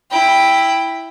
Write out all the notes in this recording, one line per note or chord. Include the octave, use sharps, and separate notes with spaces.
E4 G5